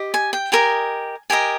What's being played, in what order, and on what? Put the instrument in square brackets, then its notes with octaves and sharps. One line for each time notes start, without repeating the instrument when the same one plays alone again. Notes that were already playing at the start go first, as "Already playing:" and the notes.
Already playing: [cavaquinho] G4 D#5
G#5
G5
G4 A#4 D#5 G#5
G4 A#4 D#5 G#5